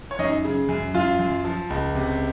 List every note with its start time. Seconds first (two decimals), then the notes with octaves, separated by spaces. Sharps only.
0.11 C#5
0.19 F#2 D#4 D#5
0.44 C#3
0.69 F#2
0.94 F#2 F4 F5
1.19 F#2
1.45 F3
1.70 C#2
1.95 C3